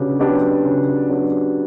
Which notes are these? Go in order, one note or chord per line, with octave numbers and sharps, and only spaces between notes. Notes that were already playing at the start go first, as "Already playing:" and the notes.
Already playing: C#3 F#3 B3 D4 G4
F#3 B3 D4 G4
C#3
F#3 B3 D4 G4